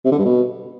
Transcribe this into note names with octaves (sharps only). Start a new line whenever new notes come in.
C3
D3
G2
B2